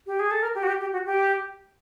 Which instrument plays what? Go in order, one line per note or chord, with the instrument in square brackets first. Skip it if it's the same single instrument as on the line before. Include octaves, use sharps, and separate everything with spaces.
[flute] G4
G#4
A4
A#4
G4
F#4
G4
G4
F#4
G4